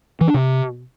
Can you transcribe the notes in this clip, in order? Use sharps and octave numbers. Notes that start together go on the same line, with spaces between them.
E3
D4
C3